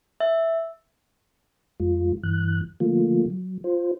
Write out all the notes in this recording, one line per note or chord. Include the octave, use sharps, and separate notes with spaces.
E5
F2 G#3 F4
G2 E3 F#6
D3 F3 A3 A#3 F4
F#3
F4 C5